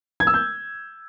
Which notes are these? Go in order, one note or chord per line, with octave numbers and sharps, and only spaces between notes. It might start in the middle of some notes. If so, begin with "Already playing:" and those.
G#6
E6
G6